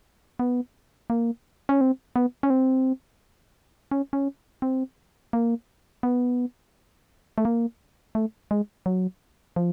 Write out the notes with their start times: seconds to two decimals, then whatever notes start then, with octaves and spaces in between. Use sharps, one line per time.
0.39 B3
1.10 A#3
1.69 C#4
1.81 C4
2.16 B3
2.43 C#4
2.50 C4
3.91 C#4
4.13 C#4
4.62 C4
5.33 A#3
6.03 B3
7.38 A3
7.45 A#3
8.15 A3
8.51 G#3
8.86 F#3
9.56 F3